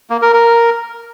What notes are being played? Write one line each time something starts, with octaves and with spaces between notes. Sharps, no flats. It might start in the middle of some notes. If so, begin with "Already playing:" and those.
A#3
A#4
A#4